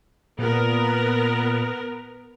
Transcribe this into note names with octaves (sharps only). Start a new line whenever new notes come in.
A#2 B3 A#4